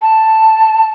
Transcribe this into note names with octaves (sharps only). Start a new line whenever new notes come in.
A5